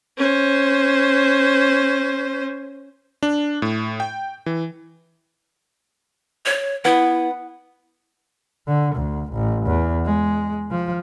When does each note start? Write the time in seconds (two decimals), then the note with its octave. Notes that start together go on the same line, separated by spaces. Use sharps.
0.17 C#4 C5
3.23 D4
3.62 A2
4.00 G5
4.46 E3
6.46 C#5
6.85 B3 E4
8.68 D3
8.96 D2
9.33 A1
9.66 E2
10.05 G#3
10.71 F3